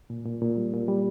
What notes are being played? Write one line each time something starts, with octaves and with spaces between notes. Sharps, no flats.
A#2
A#2
A#2
G3
A#2
G3